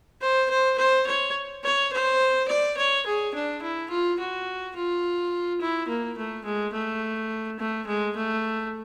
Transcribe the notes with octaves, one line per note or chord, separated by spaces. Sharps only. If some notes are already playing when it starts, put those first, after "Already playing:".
C5
C5
C5
C#5
C#5
C5
D5
C#5
G#4
D4
E4
F4
F#4
F4
E4
A#3
A3
G#3
A3
A3
G#3
A3